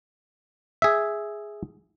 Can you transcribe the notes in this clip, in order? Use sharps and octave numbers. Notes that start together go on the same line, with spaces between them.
G#4 E5